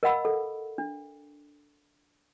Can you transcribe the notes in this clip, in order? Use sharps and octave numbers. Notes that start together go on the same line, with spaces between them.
A#4 D#5 F5 F#5 B5 E6
A4
D4